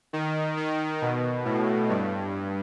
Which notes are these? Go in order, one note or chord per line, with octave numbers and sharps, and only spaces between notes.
D#3
D#3
B2
A2
G2